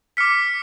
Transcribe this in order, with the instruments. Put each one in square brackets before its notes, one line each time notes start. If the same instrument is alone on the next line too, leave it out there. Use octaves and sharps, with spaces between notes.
[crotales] D6 F6 B6 C#7